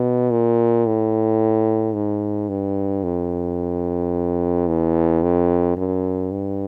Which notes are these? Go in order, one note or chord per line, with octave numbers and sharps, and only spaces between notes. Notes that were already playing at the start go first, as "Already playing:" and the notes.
Already playing: B2
A#2
A2
G#2
G2
F2
E2
F2
F#2
G2